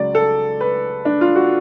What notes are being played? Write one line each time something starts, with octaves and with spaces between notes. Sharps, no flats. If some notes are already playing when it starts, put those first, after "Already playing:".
Already playing: C#2 C#3 F#3 D5
A4
B4
D4
F4
F#4